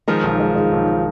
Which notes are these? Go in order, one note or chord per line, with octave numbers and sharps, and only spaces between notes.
D#3 F3 G#3
B1
G#3
G#3
B1